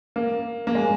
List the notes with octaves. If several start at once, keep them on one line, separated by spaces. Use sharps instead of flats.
A#3
A#3
G#3